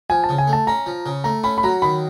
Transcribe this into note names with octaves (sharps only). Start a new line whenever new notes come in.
F3 G#5
A5
C#3
G#5
A3
A5
C#4 A#5
F3
C#3
A3 A#5
C#4 B5
B5
F#3 A#5
D#3 B5